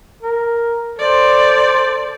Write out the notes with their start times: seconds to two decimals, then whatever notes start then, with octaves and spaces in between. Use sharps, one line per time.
0.23 A#4
0.97 A4 C5 D5